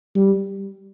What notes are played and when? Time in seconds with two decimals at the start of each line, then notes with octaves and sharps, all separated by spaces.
0.16 G3